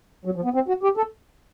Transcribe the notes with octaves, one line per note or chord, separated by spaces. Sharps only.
F#3
F3
B3
C4
F#4
G4
A4